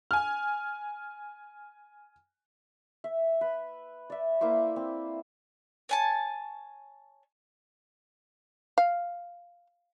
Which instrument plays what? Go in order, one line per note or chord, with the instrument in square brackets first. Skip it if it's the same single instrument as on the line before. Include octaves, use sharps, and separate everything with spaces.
[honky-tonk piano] G#5 F6
[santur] E5
B4
D5 E5
A#3 E4 C5 D6
C4
[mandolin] C#5 G#5 A5
[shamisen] F5